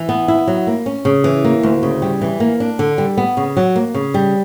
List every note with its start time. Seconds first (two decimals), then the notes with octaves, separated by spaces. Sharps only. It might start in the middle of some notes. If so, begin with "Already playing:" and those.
Already playing: E3
0.09 B3
0.28 E4
0.47 F#3
0.67 A#3
0.86 C#4
1.05 C#3
1.24 E3
1.44 A#3
1.63 D2
1.83 C#3
2.02 G3
2.22 E3
2.40 A#3
2.60 D4
2.79 D3
2.98 G3
3.18 B3
3.37 C#3
3.57 F#3
3.76 A#3
3.94 C#3
4.14 G3